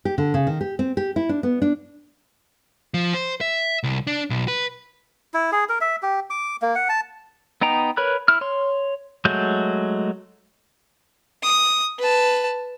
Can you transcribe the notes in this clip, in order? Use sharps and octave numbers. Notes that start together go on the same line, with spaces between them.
G4
D3
C#3
D#3
G4
C4
G4
E4
D4
B3
D4
F3
C5
E5
C2
D4
B1
B4
E4
G#4
A#4
E5
G4
D6
A#3
F#5
A5
B3 D#4 G5 A#5
A#4 B4 C#5 B5 F#6
E4 F6
C#5 C6
F#3 G#3 A3 F#4 G6
D#6
B4 A5